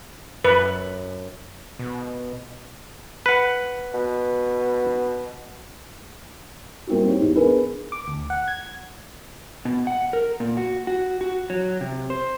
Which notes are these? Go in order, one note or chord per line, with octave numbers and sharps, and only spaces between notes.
F#2 B4
B2
B4 F#5
B2
G3 A#3 C4 D#4 E4 F#4
D#4 G4 C5 C#5
E2 G#2
B3 D4 G#4 A#4 B4
D6
D2
F#5
G#6
B2
F#5
A#4
A#2
F#4
F#4
F#4
F#3
C3
C5